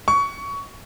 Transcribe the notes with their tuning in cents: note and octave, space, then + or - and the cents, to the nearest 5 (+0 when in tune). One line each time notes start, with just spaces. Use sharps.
C#6 +20